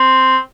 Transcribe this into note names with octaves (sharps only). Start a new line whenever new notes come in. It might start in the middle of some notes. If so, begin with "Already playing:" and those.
Already playing: C4